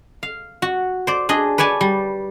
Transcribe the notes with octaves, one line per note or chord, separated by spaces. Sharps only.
F5
F#4
C5 D5
D4 G#4 D#5
B4 C#5 D5 G#5 A5
G3